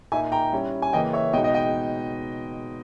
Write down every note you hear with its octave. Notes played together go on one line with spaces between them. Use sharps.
A#2 A#3 D#4 E5 G#5
G5 A#5
G3 C#4 E4
G#5
C#3 E3 A#3 E4 D#5 G5
C#5 E5
B2 G#3 D#4 D#5 G5
D#5 G5
D#5 G5